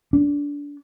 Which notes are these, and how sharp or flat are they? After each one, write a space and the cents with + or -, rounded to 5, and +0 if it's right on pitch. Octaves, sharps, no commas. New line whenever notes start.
D4 -25